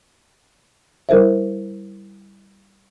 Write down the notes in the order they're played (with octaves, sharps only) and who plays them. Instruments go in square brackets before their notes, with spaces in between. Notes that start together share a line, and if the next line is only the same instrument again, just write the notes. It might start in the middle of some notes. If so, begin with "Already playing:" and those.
[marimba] G3 E4 A#4 C5 E5